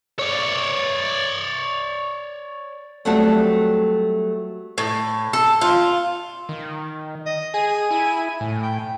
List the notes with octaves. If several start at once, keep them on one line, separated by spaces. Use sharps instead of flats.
C#5 D5
F#3 G3 A3 C4 F#4 A4
A2
A4
F4
D#3
D#5
G#4 G#5
E4
A2
G5